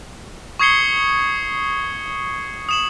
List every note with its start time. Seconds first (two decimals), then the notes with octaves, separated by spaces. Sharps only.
0.59 C#6 D#6 G#6 C7 C#7 G7
2.69 D#6 E7 F#7